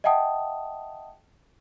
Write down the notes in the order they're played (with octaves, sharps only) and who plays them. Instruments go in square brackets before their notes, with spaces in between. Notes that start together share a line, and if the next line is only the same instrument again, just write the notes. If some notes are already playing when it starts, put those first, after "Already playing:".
[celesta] D#5 E5 F#5 G5 A5 D#6